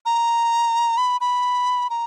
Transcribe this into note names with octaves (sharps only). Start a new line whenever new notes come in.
A#5
B5
B5
A#5